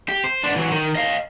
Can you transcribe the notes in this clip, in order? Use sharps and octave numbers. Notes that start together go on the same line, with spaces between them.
G4
C5
B3 D4
E3 F#3
D#3
D#5 F5